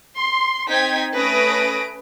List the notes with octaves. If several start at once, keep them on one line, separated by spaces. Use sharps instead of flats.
C6
C4 D#4 G5 G#6 B6
A3 C#4 B4 D#6 A#6 D7